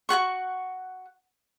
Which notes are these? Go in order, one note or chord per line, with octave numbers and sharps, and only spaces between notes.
F#4 G#4 F#5 C#6